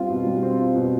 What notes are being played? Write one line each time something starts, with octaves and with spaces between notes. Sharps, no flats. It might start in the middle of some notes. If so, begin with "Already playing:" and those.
Already playing: G3 C4 F4
B2
G3
C4
F4
B2